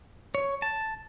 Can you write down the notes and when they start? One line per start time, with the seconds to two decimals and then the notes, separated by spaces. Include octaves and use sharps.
0.35 C#5
0.62 A5